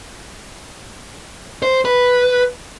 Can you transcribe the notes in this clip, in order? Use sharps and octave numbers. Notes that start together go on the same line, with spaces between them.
C5
B4